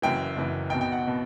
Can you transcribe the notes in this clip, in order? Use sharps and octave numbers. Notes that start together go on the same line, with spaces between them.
F#1 F#2 E3 G5
F#1 F#2 E3
B1 B2 G5
G5
F#5
B2